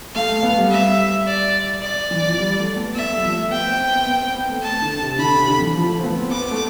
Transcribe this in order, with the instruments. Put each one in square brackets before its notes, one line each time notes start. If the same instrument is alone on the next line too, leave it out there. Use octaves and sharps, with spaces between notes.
[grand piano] A3 [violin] F5
[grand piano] A3
B3
A3
G3
[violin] E5
D5
D5
[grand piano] E3
F3
G3
A3
B3
[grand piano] B3 [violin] E5
[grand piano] A3
G3
F3
A3
[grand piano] B3 [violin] G5
[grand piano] C4
C4
B3
B3
C4
B3
A3
[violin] A5
[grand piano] D3
C3
[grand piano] D3 [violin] B5
[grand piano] C3
D3
E3
F3
A3
C4
B3
C4
[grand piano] B3 [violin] D6
[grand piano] A3